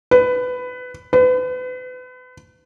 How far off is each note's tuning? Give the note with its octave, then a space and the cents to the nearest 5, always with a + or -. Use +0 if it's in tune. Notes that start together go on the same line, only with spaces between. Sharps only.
B4 +15
B4 +35